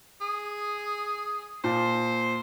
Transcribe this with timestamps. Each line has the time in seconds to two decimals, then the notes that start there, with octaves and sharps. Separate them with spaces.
0.21 G#4
1.64 A#2 C5 A5